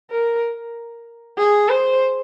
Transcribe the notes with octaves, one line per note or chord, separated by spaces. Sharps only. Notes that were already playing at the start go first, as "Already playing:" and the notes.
A#4
G#4
C5